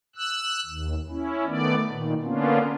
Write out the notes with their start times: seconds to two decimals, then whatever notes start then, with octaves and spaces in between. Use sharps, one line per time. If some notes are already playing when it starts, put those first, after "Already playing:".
0.15 E6 F#6
0.66 D#2
1.09 C#4 E4
1.46 D#3 A3 B3 D5
1.87 A#2 D#3
2.23 D3 A#3 B3 C#4 D4 F4